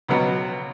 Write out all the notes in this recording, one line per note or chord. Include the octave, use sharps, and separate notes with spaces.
C#2 B2 F#3 B3